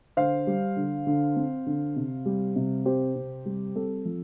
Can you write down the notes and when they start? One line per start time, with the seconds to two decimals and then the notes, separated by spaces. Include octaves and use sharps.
0.17 D3 C5 F5
0.47 G3
0.77 D3
1.07 D3
1.36 C4
1.67 D3
1.96 C3
2.26 G3
2.56 C3
2.85 C4 G4 C5
3.16 C3
3.46 G3
3.75 C4 A4
4.05 F3